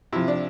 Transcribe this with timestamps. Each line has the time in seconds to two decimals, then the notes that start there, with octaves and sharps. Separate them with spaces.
0.13 C3 F3 E4
0.28 D4